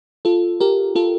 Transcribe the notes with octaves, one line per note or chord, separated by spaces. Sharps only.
F4 A4
G4 A#4
F4 A4